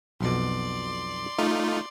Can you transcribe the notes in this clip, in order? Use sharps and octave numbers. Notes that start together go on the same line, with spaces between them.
B1 F2 B2 D5 C6
A3 D#4 F4